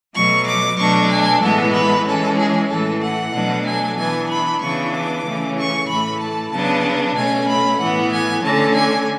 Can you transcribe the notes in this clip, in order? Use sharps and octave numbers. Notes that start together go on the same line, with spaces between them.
B2 F#3 A3 C#6
D6
B2 F#3 A3 D4 C#6
G#5
A2 E3 G#3 B3 A4
B4
E3 G#3 C#4 A4
G#4
A2 E3 A3 A4
F#5
B2 F#3 A3 D4
G#5
E3 B3 D4 G#5
B5
C#3 E3 B3 D4 C#6
D6
C#3 E3 A3 C#4
C#6
A2 E3 A3 B5
A5
C#3 F#3 B3 D4 A5
B2 A3 C#4 G#5
B5
A2 E3 B3 F#5
G#5
D3 A3 C#4 A5
G#5